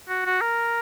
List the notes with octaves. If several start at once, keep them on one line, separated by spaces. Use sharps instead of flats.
F#4
F#4
A#4